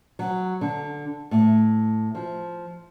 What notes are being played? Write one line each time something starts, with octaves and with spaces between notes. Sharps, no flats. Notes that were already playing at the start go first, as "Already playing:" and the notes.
F#3
D3
A2
F3